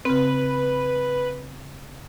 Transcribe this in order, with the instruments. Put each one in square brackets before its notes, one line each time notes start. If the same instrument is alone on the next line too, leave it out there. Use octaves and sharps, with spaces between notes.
[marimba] C#3 C4 [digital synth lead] B4